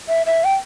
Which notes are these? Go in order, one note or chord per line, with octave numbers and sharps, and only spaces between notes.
E5
E5
G5